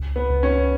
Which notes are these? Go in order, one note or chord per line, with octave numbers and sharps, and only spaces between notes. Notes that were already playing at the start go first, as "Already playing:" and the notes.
Already playing: C#2
B3
C#2
C#4